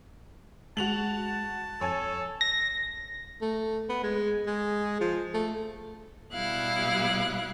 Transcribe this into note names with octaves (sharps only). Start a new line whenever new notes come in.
G#3 F#4 A5 F7 F#7
F2 A4 C#5 G#5
A#6
A3
B3
G#3
G#3
F3
A3
B2 G3 E4 F5 F#6